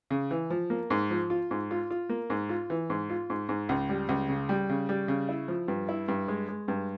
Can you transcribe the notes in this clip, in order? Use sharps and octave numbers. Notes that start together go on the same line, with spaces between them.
C#3
E3
F3
A#3
G#2
F3
F4
G#2
F4
F4
A#3
G#2
F4
E3
G#2
F4
G#2
G#2
C#2
G3
C#2
C#3
G3
C#3
G3
C#3
E4
F3
G2
E4
G2
G#3
G#3
G2